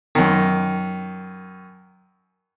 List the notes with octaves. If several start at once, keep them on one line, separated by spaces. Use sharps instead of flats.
F#2 D#3